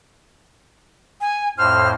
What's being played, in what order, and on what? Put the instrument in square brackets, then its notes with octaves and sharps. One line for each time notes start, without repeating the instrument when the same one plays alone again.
[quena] G#5
[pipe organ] F2 A2 C5 [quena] F6